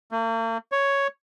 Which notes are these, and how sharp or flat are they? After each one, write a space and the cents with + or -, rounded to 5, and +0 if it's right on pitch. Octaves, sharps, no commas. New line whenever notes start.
A#3 -45
C#5 +5